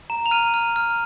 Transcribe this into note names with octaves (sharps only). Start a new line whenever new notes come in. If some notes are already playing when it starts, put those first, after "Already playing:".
A#5
F7
F6 D#7
F6
F6